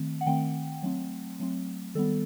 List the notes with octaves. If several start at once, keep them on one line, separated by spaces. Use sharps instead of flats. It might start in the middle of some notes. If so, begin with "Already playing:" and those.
Already playing: D#3 A3 C4
F#5
D#3 A3 C4 G5
F#3 A3 C4
F#3 A3 C4
D#3 G3 B3 A4